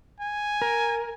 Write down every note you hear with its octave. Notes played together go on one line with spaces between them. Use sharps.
G#5
A#4